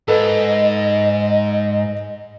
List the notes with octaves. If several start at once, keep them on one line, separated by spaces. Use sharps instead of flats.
G#2 A4 B4 D#5